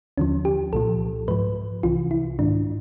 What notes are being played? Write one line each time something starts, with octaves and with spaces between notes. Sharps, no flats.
D#2 D3 F3 C#4
G4
C2 A#2 F3 A4
G#2 F3 B4
C2 C3 E3 F4
E4
G#2 D#3 D4